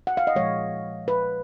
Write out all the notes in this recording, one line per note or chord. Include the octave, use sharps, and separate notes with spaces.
F#5
F5
D#5
A#2 F3 G#3 C#5
B4